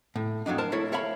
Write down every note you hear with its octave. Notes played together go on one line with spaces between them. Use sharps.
A2
F2 F#3 D4 D#4
A#4 C5 A5
A3 A#3 E4 A#4 C#5
A#4 C#5 E5 F5 A5 B5